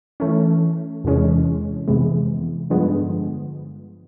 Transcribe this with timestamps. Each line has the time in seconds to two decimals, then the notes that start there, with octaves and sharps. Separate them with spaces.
0.20 E3 A3 C#4
1.04 E2 C3 E3 G#3 C#4
1.88 F2 C3 E3 G#3 B3
2.70 G2 D3 F3 G#3 B3